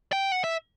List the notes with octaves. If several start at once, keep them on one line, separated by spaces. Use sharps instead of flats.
G5
F#5
E5